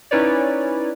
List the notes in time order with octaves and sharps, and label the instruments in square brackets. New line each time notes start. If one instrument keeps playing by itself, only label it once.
[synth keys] C#4 D#4 E4 B4 C#5 D5